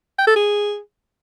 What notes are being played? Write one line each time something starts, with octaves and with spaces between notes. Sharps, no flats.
G5
A4
G#4